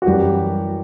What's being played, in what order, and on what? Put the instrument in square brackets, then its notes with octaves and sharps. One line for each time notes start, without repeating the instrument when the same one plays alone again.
[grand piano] F#4
F#2 E3 G3 G4